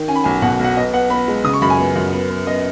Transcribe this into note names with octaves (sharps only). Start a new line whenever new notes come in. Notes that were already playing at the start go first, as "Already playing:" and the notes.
Already playing: D#3
C#4 G#5
B5
B1 G#5
B2 F#5
B1
F#5
B3 D#5
B3 F#5
B3 B5
G#3
C#3 D#6
C#6
F#2 B5
G#5
B3
F#2
B3
B3
B3 D#5